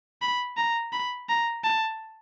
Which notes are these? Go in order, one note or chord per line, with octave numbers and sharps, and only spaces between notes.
B5
A#5
B5
A#5
A5